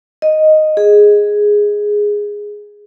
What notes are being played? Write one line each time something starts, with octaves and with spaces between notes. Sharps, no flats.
D#5
G#4